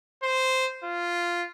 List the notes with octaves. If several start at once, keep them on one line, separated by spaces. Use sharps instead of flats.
C5
F4